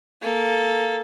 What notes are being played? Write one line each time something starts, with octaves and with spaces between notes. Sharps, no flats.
A#3 A4